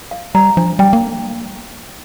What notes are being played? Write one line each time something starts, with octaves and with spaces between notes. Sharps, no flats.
F5
G3 A#5
F3 D4
G3 G5
A#3